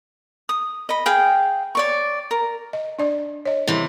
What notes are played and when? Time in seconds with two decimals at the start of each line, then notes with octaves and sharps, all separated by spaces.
0.49 D#6
0.89 D#5 B5
1.06 G#4 F5 G5
1.75 C#5 D5 C#6
2.31 A#4
2.73 D#5
2.99 D4 D5
3.46 C#5 D#5
3.67 C3 E3